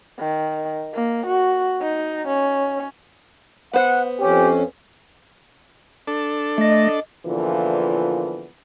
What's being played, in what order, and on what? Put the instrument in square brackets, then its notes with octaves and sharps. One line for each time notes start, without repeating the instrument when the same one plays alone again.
[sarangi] D#3
A#3
F#4
D#4
C#4
[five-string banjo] B3 C5 [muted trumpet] F#5
[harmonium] F2 C#4 [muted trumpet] G4
[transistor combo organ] D4 A4
[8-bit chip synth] A3 A#6 [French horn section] D#5
[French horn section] E2 A#2 D3 E3 F3